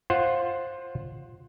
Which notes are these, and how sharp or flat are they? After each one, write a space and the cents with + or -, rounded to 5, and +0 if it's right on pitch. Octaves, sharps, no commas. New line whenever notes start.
F4 +0 C5 +20 F#5 +0